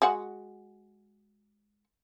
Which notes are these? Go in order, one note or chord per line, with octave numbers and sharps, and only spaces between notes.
G#3 F#4 F#5